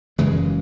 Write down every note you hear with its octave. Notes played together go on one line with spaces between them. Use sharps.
F#1 F#2 C#3 E3 G#3